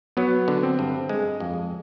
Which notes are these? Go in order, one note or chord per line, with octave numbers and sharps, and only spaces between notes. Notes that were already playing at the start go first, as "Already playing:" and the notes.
F#3 B3
D3
C4
G2
G#3
F2